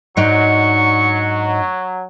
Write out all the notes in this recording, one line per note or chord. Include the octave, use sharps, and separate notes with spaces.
G#2 F#3 D4 D#4 C#6